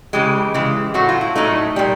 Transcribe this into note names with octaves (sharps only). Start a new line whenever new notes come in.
C#3 E3 G#3 G4
C#3 E3 G#3
A2 F#3 A3 F#4
F4
E4
A2 F#3 A3 D#4
A#2 G3